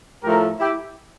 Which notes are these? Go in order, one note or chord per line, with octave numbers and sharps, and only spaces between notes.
A2 F3 A3 G4 A#4
E4 G4